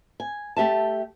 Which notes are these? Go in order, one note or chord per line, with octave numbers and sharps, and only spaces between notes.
G#5
A3 G4 E5 A5